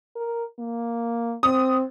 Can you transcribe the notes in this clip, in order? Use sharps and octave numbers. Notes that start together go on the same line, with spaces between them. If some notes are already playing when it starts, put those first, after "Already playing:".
A#4
A#3
C4 D#6